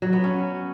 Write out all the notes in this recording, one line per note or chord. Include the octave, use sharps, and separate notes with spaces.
F#3
B3
C#4